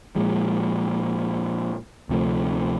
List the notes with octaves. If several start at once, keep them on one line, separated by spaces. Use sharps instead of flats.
A#2 F3 G#3
D2 C3 F3 A3